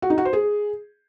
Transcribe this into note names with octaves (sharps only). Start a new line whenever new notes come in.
F#4
D#4
F#4
C5
G#4